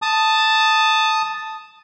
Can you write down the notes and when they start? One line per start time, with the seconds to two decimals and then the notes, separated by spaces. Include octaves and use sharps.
0.02 A5 D#6